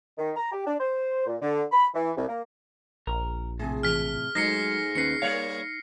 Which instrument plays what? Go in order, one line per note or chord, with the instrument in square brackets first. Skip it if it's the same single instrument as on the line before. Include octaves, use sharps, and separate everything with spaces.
[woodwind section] D#3
A#5
G4
D4
C5
A#2
D3
B5
E3
C2
A#3
[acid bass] A#1 [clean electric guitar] A#4
[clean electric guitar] A2 C3 [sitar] G#4
[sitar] E3 [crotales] F6 B6
[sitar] G#2 A3 [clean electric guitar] F#3 G#3 [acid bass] D#4 [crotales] A#6 C7 C#7
[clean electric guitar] D#2 C#4 B4 [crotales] C7 C#7
[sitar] G3 A#3 C#5 [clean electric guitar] A#4 D5 F5